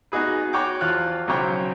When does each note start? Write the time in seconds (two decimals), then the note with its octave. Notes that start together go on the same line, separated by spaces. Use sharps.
0.12 B3 D#4 F#4 G#4 B4
0.53 F#4 C#5 G5 D6
0.81 E2 F3 F4 F#6
1.27 B1 C#3 F#3 C5 C#5 G5